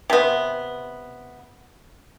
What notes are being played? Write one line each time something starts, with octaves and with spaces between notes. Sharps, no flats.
C3 B3